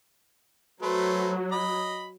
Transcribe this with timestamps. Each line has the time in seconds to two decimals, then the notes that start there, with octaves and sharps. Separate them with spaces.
0.82 F#3 A3 B4 C5
1.52 D#5 B5